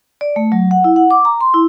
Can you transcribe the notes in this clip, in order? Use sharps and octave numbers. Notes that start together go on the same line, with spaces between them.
D5
A3
F#3
F#5
E4
F#5
D6
A#5
C6
E4